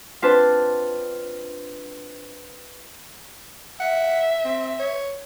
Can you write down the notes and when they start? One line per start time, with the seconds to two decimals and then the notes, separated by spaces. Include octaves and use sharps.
0.22 C4 D4 F4 B4 A5
3.80 E5 F#5
4.45 C4
4.80 C#5